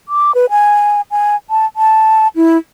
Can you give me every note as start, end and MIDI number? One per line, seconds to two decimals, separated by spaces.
0.08 0.34 86
0.35 0.46 71
0.50 1.01 80
1.11 1.36 80
1.50 1.66 81
1.76 2.28 81
2.36 2.57 64